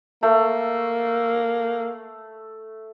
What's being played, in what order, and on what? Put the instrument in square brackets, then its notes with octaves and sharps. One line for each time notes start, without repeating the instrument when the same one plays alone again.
[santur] A3 [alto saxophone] A#3